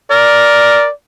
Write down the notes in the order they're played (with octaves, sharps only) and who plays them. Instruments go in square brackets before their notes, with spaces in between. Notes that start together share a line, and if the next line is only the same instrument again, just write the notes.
[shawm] A#4 [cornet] D5